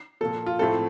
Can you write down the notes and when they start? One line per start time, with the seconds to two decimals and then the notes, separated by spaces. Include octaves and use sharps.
0.21 A#2 F3 A#3 A4
0.46 F4
0.59 A2 F3 A3 C4 A4